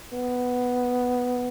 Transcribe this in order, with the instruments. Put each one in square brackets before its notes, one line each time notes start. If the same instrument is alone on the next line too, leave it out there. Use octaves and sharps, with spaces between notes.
[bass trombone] B3